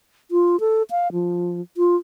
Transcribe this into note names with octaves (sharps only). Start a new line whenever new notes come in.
F4
A4
F5
F3
F4